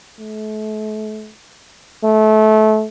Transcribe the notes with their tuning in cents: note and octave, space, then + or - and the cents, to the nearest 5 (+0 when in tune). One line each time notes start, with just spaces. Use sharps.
A3 -35
A3 -25